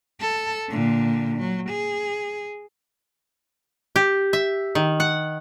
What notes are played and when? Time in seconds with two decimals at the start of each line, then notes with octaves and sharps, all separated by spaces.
0.20 A4
0.69 A#2 D3
1.38 F#3
1.69 G#4
3.96 G4
4.33 E5
4.75 D#3
5.00 F#5